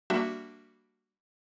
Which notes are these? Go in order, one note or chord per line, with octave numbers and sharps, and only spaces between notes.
G3 A#3 D4 F#4 E5